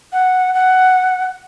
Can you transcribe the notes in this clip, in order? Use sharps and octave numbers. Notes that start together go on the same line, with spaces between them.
F#5
F#5